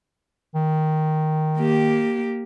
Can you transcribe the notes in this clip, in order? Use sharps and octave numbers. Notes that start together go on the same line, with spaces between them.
D#3
A#3 G4